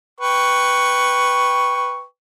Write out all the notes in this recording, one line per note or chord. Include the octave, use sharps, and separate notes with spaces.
B4 G5 C#6